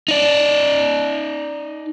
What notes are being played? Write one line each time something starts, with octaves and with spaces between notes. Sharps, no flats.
D#4 D5